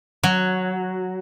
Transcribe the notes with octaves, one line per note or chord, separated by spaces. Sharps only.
F#3